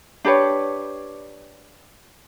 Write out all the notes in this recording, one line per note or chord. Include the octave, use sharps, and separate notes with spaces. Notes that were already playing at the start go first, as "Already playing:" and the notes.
D4 G4 B4 C#5